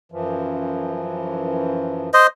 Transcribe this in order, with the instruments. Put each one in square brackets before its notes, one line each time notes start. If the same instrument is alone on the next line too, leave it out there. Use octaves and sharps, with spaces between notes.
[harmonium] F#2 E3 F3
[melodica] C5 D#5